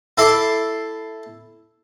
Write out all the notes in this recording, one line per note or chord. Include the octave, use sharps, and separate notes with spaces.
E4 A4 C6 D6